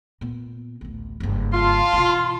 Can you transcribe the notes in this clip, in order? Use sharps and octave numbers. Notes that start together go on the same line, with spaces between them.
A#2 B3
A1 D2
F#1 G2
F4 A5 C6
B2 E3